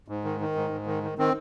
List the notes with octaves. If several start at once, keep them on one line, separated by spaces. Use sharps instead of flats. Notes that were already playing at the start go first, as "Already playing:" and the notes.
G#2
D#3
D#3
G#2
G#2
D#3
D#3
D#3 C4